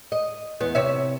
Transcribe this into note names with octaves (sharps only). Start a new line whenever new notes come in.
D#5
E2 B3
C3 C#5 E5